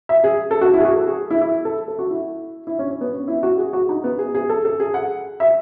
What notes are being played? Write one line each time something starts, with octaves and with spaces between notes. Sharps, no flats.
E5
G#4
A4
F#4
E4
G#4
F#4
A4
G#4
E4
E4
A4
A4
F#4
E4
E4
C#4
C#4
B3
C#4
E4
F#4
G#4
F#4
D#4
B3
G#4
G#4
A4
A4
G#4
F#5
E5